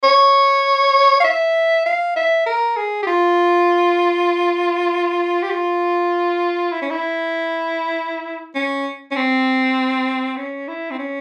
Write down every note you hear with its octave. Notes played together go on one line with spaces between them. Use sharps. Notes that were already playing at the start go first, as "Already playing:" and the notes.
C#5
F5
E5
F5
E5
A#4
G#4
G4
F4
G4
F4
E4
C#4
E4
C#4
C#4
C4
C#4
E4
C4
C#4